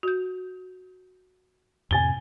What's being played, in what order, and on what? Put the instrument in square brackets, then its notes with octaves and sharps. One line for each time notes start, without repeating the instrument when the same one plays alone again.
[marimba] F#4 G6
[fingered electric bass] F2 A2 C3 [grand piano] G#5 A6 G7